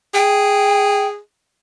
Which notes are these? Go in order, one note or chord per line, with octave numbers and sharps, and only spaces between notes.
G#4 G5